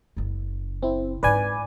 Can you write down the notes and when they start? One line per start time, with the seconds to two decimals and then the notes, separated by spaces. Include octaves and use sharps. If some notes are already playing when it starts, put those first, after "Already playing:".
0.17 F#1 C#3
0.83 C4 E4
1.23 G#2 D4 B4 D5 G#5